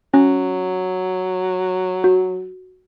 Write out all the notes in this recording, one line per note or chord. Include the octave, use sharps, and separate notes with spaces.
F#3 C#4
F#4